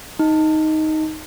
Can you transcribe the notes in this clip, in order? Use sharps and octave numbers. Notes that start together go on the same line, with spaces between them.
D#4